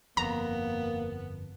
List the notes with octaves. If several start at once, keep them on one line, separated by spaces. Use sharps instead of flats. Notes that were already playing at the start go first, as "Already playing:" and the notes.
G1 F2 A#3 B3 A#5